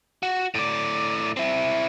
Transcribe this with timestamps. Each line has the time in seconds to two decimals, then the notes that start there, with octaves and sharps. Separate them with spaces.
0.23 F#4
0.55 A2 D5
1.37 C4 E4